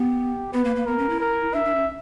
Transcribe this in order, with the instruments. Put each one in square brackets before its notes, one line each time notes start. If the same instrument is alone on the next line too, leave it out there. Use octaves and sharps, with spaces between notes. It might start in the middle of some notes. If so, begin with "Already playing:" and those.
Already playing: [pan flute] B3 [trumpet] G4
[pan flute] B3 [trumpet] B4
[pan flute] A#3
A#3
[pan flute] B3 [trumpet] A#4
[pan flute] C#4
E4
[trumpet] A#4
[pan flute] D4 [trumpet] E5
[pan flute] D4
C#4